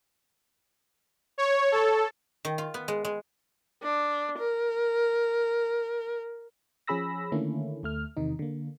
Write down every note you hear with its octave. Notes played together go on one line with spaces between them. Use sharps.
C#5
A4
D#3
F4
B3
G#3
G#3
D4
A#4
F3 C#4 G#4 B5 E6 A#6
D3 D#3 A3 A#3 C#4 E4
D2 A3 F6
E2 C3 D#3 D#4
D3 A#3